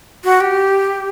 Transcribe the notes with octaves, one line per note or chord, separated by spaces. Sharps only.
F#4
G4